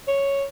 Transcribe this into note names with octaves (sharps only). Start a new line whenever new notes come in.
C#5